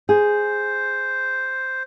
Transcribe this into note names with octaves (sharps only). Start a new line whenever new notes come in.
G#4 C5